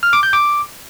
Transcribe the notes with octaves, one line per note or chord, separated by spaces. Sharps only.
F6
D6
G6
D6